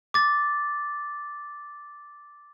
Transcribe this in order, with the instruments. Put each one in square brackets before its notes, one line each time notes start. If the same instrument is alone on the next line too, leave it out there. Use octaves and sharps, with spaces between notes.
[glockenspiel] D6 A6